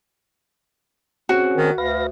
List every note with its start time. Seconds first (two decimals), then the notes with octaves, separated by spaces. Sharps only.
1.29 C4 C#4 F#4 G#4
1.57 D#3
1.78 D2 B4 F5 A#6